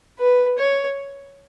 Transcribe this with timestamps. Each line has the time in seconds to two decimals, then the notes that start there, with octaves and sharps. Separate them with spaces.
0.19 B4
0.58 C#5